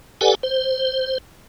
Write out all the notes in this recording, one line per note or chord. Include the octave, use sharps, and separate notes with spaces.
G4 A4 B4 D5 F#5 G#5
C5